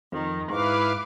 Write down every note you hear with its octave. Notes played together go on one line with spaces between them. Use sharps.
F2 D#3
G#2 E4 B4 F5 D6